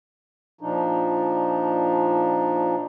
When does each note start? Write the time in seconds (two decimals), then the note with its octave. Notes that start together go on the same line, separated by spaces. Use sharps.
0.61 A#2 F3 D4 D#4